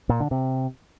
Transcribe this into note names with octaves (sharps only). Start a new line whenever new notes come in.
A#2
D3
C3